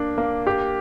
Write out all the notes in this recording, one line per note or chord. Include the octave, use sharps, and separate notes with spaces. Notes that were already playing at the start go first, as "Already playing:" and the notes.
Already playing: A#3 D4
A#3
G4